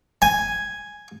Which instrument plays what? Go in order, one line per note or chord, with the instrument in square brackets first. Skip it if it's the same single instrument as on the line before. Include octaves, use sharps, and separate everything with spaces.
[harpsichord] G#5